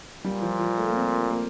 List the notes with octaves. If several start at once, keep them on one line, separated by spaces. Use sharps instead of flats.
A#2 G3
F3
F3
A3
A#3
C4
A#3